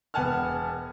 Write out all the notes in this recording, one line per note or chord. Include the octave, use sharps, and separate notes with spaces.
E1 B3 F#5 G#5 A5 F6